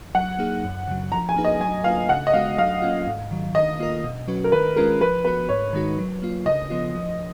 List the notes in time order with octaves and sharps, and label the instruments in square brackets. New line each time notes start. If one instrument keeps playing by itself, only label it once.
[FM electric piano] F#3 [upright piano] F#5
[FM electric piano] A#3 D#4 G#4
F#2
C#3 F#3
[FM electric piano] F3 [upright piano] A#5
[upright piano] G#5
[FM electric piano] A#3 D#4 G#4 B4
[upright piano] D#5
[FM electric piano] F#3 [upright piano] G#5
[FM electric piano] A#3 F4 B4 [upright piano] F5
[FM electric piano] C#3 [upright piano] F#5
[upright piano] D#5
[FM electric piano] G#3 B3 F#4 [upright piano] F5
[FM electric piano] F#3 [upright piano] F5
[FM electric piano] A#3 C#4 F4
G#2
D#3 F#3
[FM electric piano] D#3 [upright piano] D#5
[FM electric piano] A#3 F4 A#4
B2
F#3 C#4 F#4 B4
[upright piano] A#4
[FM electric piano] D#3 [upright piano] B4
[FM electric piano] G#3 C#4 F4 G#4 [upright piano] A#4
[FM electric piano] F3 [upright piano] B4
[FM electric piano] B3 F#4 [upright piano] B4
[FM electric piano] G#2 [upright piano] C#5
[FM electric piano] D#3 G#3 D#4 F#4
F#3
A#3 F4
[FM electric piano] C#3 [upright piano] D#5
[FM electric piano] F3 B3 F4
F3